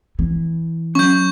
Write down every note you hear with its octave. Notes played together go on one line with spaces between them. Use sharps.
E3
F#3 C#4 C#6 G6